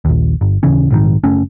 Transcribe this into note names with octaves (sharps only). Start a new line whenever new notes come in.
A#1 D#2
G1
D#1 C#3 E3 C#4
A#1 G#2 D#3
F#1 A3 C#4